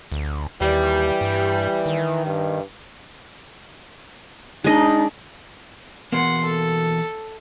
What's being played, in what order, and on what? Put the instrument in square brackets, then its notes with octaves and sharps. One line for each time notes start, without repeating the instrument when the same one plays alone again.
[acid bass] D2
[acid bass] D#2 [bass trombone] E3 [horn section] G3
[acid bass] G2
D#3
[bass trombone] G2
[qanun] G#3 D#5 [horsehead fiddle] D4 [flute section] D#4
[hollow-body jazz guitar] E2 B2 A#3 [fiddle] F#5 C6
[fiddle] A4